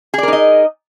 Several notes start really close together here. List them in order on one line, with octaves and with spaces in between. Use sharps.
G#4 D5 A#4 D#4 D#5